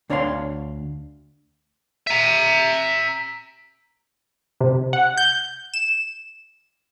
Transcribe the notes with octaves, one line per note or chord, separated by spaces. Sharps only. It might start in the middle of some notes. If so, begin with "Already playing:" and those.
D2 D4 C#5 F5 G5 C6
E5 A#5
C3
F#5
G6
E7